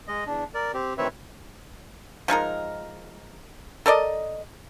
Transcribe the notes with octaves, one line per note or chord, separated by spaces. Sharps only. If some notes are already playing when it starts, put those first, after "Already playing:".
G#3 D#5
E2 D4
A#4 D5
C4 G4
D2 D#3 C4 B4 C#5 E5
F3 G#3 D#4 A#4
A4 A#4 D5 D#5